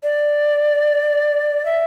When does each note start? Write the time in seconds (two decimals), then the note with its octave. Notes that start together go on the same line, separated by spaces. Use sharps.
0.03 D5
1.65 E5